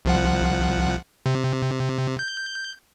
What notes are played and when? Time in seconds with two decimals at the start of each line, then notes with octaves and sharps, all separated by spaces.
0.05 C2 F3 F#5
1.26 C3
2.19 G6